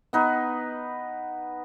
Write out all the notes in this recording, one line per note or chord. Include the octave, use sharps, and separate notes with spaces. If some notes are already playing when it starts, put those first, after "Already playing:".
B3 D#4 B4